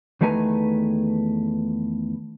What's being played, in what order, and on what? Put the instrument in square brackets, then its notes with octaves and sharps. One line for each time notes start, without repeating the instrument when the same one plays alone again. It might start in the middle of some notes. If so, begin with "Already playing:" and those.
[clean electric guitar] E2 D#3 A3 B4 G#5 A#5